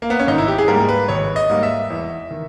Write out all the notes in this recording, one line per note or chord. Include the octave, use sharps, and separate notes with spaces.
A#3
B3
C#4
G#1 D#4
E4
G4
G#4
G#2 G3 A#3 A#4
B4
G#1 C#5
D#5
G#2 G3 A#3
E5
E2
D#3